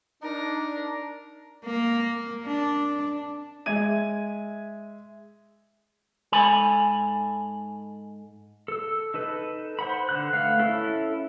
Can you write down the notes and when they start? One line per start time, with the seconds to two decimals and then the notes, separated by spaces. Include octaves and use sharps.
0.23 D4 D#4 A#4
1.65 A#3
2.47 D4
3.66 G#3 E5 G#6 D#7
6.32 G#2 A4 G#5 B5
8.68 A4 E6
9.14 D#4 A4 B4
9.79 C5 F#5 B5
10.09 D3 F#5 F#6
10.33 A3 B4 F5 F#5
10.59 C#4 E4 A4